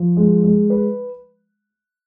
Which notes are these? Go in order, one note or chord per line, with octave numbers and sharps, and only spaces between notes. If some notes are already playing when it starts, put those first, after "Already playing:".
Already playing: F3
G#3
G#3
B4